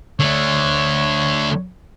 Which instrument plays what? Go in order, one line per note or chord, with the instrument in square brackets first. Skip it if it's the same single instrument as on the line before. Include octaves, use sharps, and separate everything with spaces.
[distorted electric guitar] D3 A3 [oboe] C#5